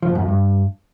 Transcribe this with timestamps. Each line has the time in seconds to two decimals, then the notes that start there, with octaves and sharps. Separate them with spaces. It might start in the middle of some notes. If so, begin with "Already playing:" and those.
0.03 F3
0.09 A2
0.15 F#2
0.22 F2
0.28 G2